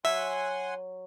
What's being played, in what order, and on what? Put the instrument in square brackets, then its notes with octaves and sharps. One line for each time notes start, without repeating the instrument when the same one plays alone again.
[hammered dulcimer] F#3 [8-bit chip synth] E5 [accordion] F#5 G#5 C6